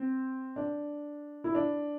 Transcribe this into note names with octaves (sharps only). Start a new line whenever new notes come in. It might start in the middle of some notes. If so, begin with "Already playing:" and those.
Already playing: C4
D4
E4
D4